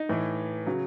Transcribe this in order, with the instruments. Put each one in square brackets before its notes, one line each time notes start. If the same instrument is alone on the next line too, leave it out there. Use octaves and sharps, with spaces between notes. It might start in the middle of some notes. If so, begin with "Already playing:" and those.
Already playing: [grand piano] D#4
A2 E3
C#3 F#3